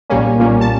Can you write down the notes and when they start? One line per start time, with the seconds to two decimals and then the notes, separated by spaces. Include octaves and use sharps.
0.10 B1 A#2 G3 A#3 C#4
0.39 B1 A#2 G3 A#3 C#4
0.61 A5